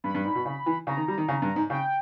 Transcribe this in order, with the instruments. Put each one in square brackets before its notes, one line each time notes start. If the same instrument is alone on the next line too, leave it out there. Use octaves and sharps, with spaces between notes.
[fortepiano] G2 [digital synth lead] B5
[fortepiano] G2
G#2
B2
C#3
E3
[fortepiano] C#3 [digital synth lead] A#5
[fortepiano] D#3
G3
D#3
C#3
G2
G#2
[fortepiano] C#3 [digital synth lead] G5